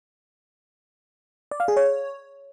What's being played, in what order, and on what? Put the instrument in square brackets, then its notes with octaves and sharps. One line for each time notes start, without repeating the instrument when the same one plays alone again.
[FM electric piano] D5
F5
G#4
C#5